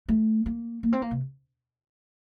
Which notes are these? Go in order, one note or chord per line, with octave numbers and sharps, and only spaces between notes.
A3
A#3
A#3
C4
A#3
C3